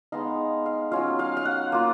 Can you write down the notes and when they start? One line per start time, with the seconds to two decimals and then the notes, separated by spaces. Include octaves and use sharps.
0.12 G#3 B3 D#4 F5
0.66 F5
0.92 F#3 C#4 F4 F5
1.19 F5
1.37 F5
1.45 F#5
1.72 A#3 F4